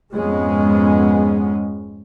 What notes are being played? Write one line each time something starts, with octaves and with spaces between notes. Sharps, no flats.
F2 G#2 G#3 B3 C#4